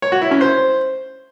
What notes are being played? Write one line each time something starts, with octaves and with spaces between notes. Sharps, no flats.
C#5
F#4
E4
C#4
C5